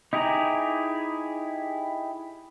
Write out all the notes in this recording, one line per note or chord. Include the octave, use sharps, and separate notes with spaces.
D#4 E4 G4 G#4 A#5